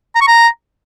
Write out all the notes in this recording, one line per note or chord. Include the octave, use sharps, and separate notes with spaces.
A#5
C#6
A#5